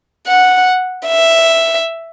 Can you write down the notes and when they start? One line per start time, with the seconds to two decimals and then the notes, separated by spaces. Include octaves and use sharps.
0.27 F#5
1.07 E5